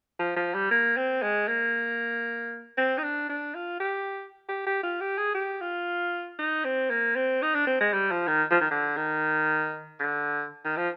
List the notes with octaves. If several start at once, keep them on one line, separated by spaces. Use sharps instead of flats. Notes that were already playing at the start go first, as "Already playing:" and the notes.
F3
F3
G3
A#3
C4
G#3
A#3
C4
D#4
D4
D4
F4
G4
G4
G4
F4
G4
G#4
G4
F4
D#4
C4
A#3
C4
D#4
D4
C4
G#3
G3
F3
D#3
F3
D#3
D3
D#3
D3
D#3
F3